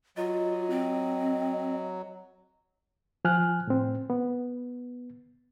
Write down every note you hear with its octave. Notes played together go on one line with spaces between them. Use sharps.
F#3 F4 D#5
C4
F3 G#5 F6 F#6
A2 C4
B3